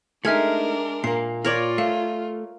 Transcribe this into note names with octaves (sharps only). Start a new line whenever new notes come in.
G#3 A3 D4 D#4 A#4 E5 F6 G#6
A#2 A#3 C7
F4 A#4 C#5 D5
A3 F5